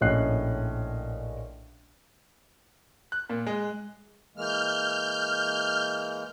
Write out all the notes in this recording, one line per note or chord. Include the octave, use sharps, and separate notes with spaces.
A#1 A2 C#4 D#5 F#6 C7
F#6
A#2
G#3
E3 G#3 A#3 F6 G6